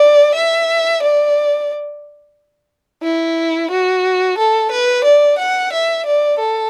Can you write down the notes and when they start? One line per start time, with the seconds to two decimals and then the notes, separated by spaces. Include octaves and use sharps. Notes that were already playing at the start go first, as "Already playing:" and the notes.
Already playing: D5
0.34 E5
1.02 D5
3.03 E4
3.71 F#4
4.38 A4
4.71 B4
5.04 D5
5.38 F#5
5.72 E5
6.06 D5
6.39 A4